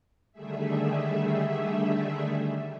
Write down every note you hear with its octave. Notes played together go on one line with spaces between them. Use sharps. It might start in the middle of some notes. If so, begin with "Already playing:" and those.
D3 D#3 G3 A3 G#4 E5